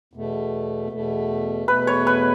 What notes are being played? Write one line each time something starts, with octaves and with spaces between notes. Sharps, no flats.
E2 B2 A3
E2 B2 A3
E2 B2 A3 B4
C#5
B4